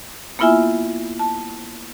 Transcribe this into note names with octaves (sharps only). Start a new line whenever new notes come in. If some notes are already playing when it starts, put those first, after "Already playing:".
A#3 B3 E4 F4 E5 G#5
A5